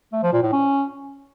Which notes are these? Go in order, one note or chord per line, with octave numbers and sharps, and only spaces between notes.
A3
F3
A#2
A2
C#4